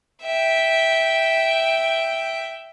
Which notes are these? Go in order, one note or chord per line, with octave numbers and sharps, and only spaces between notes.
E5 G5